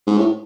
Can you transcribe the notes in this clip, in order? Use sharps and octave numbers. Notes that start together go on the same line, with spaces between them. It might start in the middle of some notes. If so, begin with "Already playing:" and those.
G#2
A2